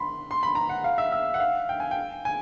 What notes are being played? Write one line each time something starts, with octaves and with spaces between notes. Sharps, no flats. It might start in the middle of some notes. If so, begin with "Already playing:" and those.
Already playing: B5 C6
C6
B5
A#5
F#5
F5
E5
E5
F#5
F5
G5
G#5
G5
G#5